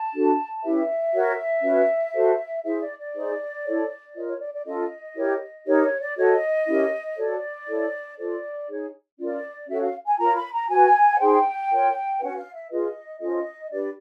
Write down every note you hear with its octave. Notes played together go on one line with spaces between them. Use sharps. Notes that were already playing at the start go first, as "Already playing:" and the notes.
Already playing: A5
D4 F#4 A4
C#4 E4 G4 B4 E5
F#4 A#4 C#5
C#4 F#4 B4
F#4 A4 C5
E4 G#4 C5 E5
D5
D5
D#4 G#4 C5
E4 A4 C#5
F4 A#4 C#5 D#5
C#5
D5
D5
C#4 F4 A4 D#5
E4 G4 A#4 C#5
D#4 G4 A#4 C#5
C#5
D5
F#4 A4 C#5 D#5
C#4 E4 G4 A#4
F#4 A4 C#5 D5
E4 A4 C#5
F4 A4 C5 D5
D#4 G#4 C#5
C#4 F4 A#4 D5
C#4 F#4 A4 C#5 E5
F5
G#5
F4 A#4 C#5 A#5
B5
A#5
F#4 B4 G#5
F#5
D#4 G#4 C5 G5
F4 A#4 C#5
C#4 F#4 B4 F#5
F5
E5
F4 G#4 B4 D#5
C#4 F4 A4 C5 D#5
D4 G4 B4 D5